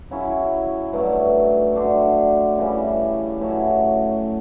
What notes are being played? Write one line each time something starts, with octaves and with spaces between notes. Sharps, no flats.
C#3 F#3 C#4 E4
G2 F#3 A3
D3 A3 D4 F#4
C#3 E3 G3
A2 F#3 C#4 F#4